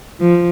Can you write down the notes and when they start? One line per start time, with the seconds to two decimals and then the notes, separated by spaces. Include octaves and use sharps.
0.20 F3